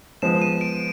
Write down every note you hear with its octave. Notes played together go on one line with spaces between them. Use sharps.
F3 G#3 B3 E7
D#7
D7